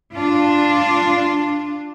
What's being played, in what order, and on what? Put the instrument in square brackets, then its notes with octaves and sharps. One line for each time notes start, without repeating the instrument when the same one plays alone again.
[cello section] D4 F4